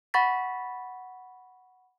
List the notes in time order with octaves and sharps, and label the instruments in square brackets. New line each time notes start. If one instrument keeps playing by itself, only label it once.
[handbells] F#5 B5 C#6 A6 B6